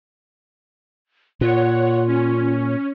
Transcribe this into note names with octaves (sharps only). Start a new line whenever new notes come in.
A#2 F4 C#5 F#5
C#4